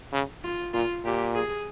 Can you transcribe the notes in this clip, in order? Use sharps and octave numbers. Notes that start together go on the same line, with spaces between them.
C#3
F4
A#2 F4
A#2 G4
G#4